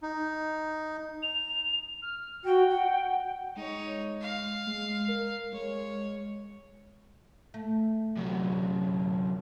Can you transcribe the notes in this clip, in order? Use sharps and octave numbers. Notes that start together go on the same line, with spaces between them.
D#4
F7
F6
F#4 G5
F#5
G#3 D#4 C#5
F5
G#3
A#4
G#3 C#5
A3
F#2 C3